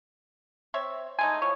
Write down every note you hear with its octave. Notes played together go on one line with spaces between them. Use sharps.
C4 C#5 E5
G#3 A3 D#4 G#5
E3 F3 C#5